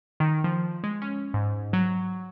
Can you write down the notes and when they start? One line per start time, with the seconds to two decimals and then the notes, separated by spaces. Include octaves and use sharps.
0.20 D#3
0.44 F3
0.84 G#3
1.02 C#4
1.34 G#2
1.73 F#3